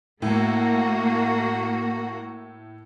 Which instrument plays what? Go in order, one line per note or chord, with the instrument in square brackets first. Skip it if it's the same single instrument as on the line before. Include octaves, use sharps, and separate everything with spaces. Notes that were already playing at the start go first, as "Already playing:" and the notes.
[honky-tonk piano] A2 [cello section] A3 A#3 F#4